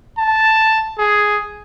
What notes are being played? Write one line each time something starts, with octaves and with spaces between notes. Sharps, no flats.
A5
G#4